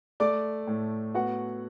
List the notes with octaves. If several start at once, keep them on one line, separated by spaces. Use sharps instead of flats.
A3 D5 D6
A2
B3 F#4 F#5